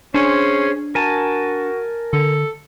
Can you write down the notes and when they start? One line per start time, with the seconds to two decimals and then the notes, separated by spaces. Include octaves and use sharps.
0.14 C#4 D4 G#4 C5
0.95 F#4 A#4 G#5 A5
2.13 D3 A4